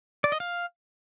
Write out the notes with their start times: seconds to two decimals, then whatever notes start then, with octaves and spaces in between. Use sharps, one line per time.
0.24 D5
0.32 D#5
0.40 F5